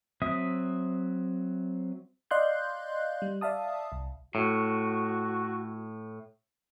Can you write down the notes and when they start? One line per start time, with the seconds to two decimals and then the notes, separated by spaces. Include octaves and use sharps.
0.22 F#3 C4 E5 D#6
2.31 D5 D#5 F5 C6 F#6 G6
3.22 G3
3.41 D5 E5 F5 A5 D#6
3.92 C2
4.35 A2 F#4